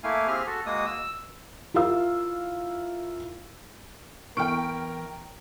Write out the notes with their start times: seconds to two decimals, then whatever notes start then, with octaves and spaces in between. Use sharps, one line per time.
0.04 A3 A#3 E4 F5 G#5
0.27 C4 G4 G#4 F6
0.47 F#4 A4
0.66 G#3 A#3 F#4 D#6
0.86 E6
1.74 E4 F4 A#4 F5 E6
4.37 E3 B3 E4 A#4 G5 C#6 F6 D7